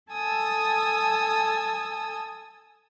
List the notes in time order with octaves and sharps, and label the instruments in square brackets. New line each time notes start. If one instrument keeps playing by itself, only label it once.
[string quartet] A4 G#5 A5 D#6 E6